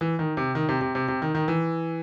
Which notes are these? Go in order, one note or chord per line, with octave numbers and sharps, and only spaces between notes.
E3
D#3
C3
D#3
C3
C3
C3
C3
D#3
D#3
E3